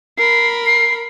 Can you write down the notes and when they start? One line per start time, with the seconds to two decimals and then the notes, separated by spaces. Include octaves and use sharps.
0.18 A#4 B5 C7
0.66 C7